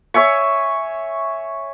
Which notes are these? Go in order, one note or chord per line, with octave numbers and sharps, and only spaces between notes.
C#5 E5 G#5 C#6